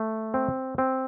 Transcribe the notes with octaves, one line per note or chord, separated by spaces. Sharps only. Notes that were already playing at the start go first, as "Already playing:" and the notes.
Already playing: A3
C4
C4